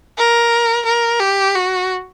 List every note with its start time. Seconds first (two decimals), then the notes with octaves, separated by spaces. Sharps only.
0.18 A#4
0.85 A#4
1.20 G4
1.55 F#4